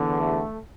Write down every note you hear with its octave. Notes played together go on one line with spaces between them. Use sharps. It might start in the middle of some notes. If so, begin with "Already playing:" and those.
Already playing: E2 D3
A3